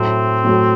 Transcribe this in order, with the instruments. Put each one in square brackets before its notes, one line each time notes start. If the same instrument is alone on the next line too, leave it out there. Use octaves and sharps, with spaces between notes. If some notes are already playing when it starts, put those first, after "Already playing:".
Already playing: [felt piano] A2 F#3 A3 [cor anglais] C4
[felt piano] A2 F#3 A3